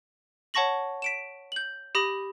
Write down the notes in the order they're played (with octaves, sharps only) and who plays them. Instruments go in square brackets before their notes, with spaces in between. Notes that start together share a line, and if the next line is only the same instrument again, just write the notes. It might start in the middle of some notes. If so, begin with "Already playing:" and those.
[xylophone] C#5 F#5 A5 C#6 A#6 F#7
B6 D7 E7
G6 F#7
G4 B5 D#6 A#6 F#7